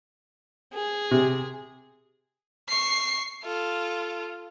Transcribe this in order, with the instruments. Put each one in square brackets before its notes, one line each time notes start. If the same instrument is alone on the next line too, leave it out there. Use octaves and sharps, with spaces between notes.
[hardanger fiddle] G#4
[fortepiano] C3
[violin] C#6 C7
F4 A4